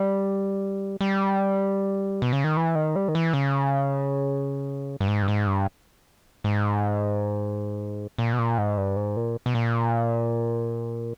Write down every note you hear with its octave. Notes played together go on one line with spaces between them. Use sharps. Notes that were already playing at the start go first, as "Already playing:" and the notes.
Already playing: G3
G3
B2
C#3
D#3
E3
D#3
G3
D#3
E3
C#3
G2
G#2
G2
G#2
G2
G#2
A#2
B2
A#2
G#2
G2
G#2
A#2
B2
A#2